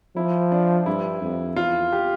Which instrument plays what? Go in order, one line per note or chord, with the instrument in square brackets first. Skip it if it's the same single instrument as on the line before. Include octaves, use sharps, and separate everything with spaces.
[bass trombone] F3 [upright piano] E4
[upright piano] D4
[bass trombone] G2 [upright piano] E4
[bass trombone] F2
[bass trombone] E2 [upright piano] F4
[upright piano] G4